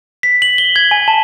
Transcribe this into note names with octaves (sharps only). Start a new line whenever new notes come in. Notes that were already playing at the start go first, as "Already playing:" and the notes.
B6
F#7
G7
G#6
G#5
A5